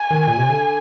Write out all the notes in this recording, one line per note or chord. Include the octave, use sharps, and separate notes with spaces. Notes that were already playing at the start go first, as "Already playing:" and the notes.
Already playing: G#5
D#3
A#2
C3
D3